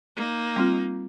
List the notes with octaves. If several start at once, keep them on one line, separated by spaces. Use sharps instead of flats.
A#3 D#4
G3 C4 F4